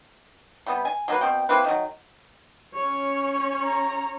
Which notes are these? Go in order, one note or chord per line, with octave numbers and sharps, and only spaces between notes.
C3 G3 B3
G#5
F#3 A3 A#3 B4
B2 C4 G5
A#3 C4 E4 B4
D#3 F#3
C#4 C#5
A#5